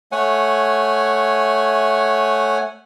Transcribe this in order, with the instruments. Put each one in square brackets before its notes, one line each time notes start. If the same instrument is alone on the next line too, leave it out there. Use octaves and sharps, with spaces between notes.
[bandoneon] A3 C#5 F#5 G#5